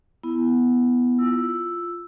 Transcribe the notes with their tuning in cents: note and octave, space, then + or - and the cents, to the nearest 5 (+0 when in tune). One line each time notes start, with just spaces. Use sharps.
B3 +0 E4 +0
F4 -5 E6 +0